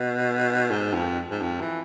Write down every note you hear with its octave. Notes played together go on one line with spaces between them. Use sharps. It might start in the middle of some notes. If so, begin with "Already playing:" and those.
Already playing: B2
G#2
F2
G#2
F2
E3